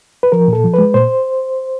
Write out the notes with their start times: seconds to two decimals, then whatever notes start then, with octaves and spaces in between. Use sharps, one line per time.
0.23 B4
0.32 F3 A#4
0.48 A#2 A4
0.64 F3
0.74 G#3 B4
0.94 A#2 C5